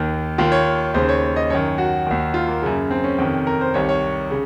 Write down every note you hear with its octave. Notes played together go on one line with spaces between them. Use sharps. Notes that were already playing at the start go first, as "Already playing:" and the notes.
Already playing: D#2 D#3
D#2 D#3 F4
C#5
D#2 C#3 C5
C#5
D#5
F#2 D#3 C#5
F#4
D#2 D#3
F4
A#3
F#2 C#3
C4
C#4
F2 C3 D#3
A#4
C5
C2 C3 D#3 C#5
C#5
C#3